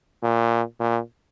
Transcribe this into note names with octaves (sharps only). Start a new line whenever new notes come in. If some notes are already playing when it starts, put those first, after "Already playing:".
A#2
A#2